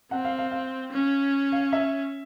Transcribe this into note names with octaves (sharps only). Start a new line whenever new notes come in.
C4 F#5
F5
F5
F5
C#4
F5
E5